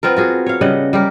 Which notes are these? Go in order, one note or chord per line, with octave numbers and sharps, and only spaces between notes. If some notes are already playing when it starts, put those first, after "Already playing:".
B3 C4 F4 A#4
F4 F#4 G#4
C#5 F5
C#3 G3 D#5 F#5
G3 G4 A#4